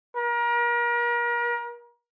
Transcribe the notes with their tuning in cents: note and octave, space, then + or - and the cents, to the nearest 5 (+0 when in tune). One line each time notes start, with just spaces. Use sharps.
A#4 +35